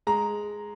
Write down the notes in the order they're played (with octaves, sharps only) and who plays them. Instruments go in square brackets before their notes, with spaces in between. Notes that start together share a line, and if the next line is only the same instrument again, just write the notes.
[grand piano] G#3 A#5